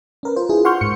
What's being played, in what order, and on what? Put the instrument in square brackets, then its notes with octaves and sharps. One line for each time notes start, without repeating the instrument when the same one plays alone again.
[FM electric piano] C#4 A#4 B4
F4 C5
D4 E4 F4 G#4
F#5 C6 C#6 F6 G6
G#2 C#7